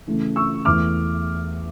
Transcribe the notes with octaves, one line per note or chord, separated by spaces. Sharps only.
C#3 E3 A3
C#6 E6
E2 E3 A3 D6 F6